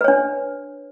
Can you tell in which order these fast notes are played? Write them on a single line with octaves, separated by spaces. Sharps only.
B4 C#5 D4